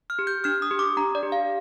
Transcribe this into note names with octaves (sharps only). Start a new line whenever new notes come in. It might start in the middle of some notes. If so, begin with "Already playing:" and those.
F6
G4
G6
D4 F6
D#6
G4
D6
D4 A#5
D5
G4
F5